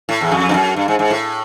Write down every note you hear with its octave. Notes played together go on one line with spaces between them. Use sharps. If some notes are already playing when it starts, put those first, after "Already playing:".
A2
E2
F2
G2
F#2
G2
G#2
G#2
A2